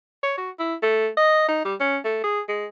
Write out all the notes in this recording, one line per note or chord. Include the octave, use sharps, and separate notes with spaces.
C#5
F#4
E4
A3
D#5
D#4
G3
C#4
A3
G#4
G#3